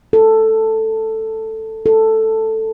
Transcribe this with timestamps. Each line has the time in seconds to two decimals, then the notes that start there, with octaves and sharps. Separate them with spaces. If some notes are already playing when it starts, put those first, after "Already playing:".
0.13 A4
1.86 A4